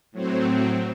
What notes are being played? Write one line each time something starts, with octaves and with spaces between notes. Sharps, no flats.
A2 F#3 C4